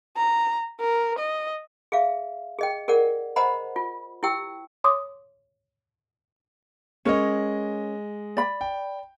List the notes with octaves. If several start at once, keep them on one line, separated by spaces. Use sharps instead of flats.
A#5
A#4
D#5
G#4 E5 F5
G#4 D#5 G5
G#4 A#4 D5 F#5
C5 D#5 F#5 A#5 B5
F4
E4 G4 G5 E6
C#5 C6 D6 D#6
G#3 C#4 A#4 C#5 D#5
D5 B5
G5